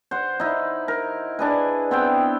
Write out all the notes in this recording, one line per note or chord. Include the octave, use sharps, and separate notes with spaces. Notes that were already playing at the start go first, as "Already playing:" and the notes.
C5 F#5
D#4 E4
A#4
D4 G#4 B4
B3 C4 E4 G5